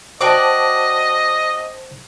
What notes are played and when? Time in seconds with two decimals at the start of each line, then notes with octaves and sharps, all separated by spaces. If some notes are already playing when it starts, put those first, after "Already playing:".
0.21 F#4 C5 D5 D#5 G5 A5 D6